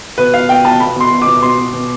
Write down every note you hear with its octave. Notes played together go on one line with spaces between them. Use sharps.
B2 B4
B2 F5
B2 G5
B2 A5
B2 B5
B2 C6
B2
B2 D6
B2 C6
B2
B2